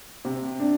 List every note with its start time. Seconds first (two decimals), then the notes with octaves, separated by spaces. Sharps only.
0.25 C3
0.60 D4